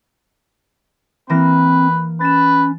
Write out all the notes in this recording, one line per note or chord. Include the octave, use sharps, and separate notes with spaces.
E3 A#3 C4 B4 A#6
C#4 B4 A6 E7